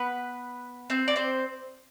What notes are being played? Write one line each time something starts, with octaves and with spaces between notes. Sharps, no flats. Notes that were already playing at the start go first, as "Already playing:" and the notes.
Already playing: B3 B4
C4 C5
D5
C4 C5